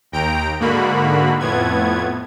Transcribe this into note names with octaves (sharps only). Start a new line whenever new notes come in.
D#2 G5 A#5 D7
G#2 D3 A#3 F#4 B5
F2 A2 B3 G#6